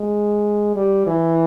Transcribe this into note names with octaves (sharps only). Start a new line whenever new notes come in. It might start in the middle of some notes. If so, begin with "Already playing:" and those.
Already playing: G#3
G3
E3